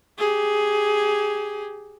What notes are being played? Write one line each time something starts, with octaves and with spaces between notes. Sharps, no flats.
G4 G#4